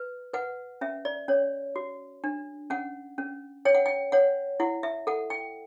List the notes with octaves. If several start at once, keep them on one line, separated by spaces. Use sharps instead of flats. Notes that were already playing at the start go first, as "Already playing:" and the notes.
Already playing: B4
B4 F#5
C#4 E5
D5
C#4 C#5
F#4
D4
C#4 F#5
C#4
C#5 G5
F#5
G5
C#5 F#5
E4 F#5
E5
A4 F#5
G5